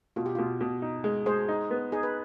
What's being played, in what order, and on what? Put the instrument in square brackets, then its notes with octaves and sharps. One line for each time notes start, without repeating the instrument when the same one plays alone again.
[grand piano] B2 [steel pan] F4
[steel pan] G4
[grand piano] B2 [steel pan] F4
[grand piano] B2
D#4
G#3
[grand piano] G#3 [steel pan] G#4 C5
[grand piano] D#4
B3
[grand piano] D#4 [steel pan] G#4
[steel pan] B4